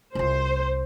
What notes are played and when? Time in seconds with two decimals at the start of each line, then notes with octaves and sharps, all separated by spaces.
0.15 C2 F4 C5